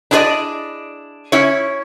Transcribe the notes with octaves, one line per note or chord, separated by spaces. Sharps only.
D4 E4 G#4 C5 D5 D#5
C#4 E4 C#5